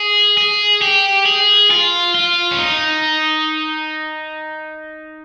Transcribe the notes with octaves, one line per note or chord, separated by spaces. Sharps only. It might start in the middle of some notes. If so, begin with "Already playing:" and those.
Already playing: G#4
G#4
G4
G#4
F4
F4
C#4
D#4